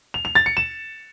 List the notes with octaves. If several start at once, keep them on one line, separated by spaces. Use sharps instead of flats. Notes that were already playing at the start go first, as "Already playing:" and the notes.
F7
F7
A6
C#7
E7